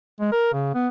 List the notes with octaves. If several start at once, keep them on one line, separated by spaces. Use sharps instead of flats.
G#3
A#4
C#3
B3